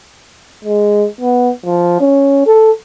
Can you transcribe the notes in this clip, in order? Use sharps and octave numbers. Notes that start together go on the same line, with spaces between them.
G#3
B3
F3
C#4
A4